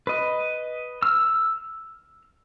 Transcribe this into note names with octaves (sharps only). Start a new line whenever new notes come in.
B4 D#5
E6 F6